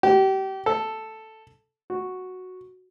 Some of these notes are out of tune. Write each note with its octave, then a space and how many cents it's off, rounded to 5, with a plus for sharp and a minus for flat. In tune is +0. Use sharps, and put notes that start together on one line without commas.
G4 -30
A4 +0
F#4 -5